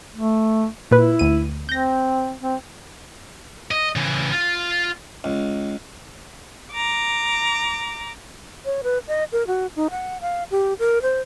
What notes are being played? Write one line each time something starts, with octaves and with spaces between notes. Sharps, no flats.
A3
A#2 E4 B4
D2 D#7
C4 G6 A#6
C4
D#5
C#3 E3
F4
C#2
A#5 D6
C#5
B4
D#5
A#4
F#4
D#4
F#5
F5
G4
A#4
C5